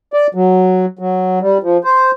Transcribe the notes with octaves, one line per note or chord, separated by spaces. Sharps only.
D5
F#3
F#3
G3
F3
C5